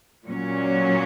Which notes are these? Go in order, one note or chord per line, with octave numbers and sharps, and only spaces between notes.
A#2 F#3 C#4